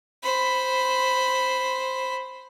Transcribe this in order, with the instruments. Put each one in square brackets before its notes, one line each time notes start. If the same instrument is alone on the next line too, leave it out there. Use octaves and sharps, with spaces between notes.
[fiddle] C5 B5